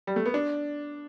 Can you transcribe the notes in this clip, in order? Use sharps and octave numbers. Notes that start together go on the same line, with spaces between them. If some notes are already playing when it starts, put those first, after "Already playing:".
G3
A3
B3
D4